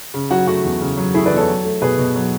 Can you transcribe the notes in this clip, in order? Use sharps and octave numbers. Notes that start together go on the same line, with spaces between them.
C#3
F#3 F#4
A3 F#4
E2
C#3
F#3
A3 E4 G#4
B4 D5
E2
A4 C#5
F#3
A3
B2 G#4 B4
B2
F#3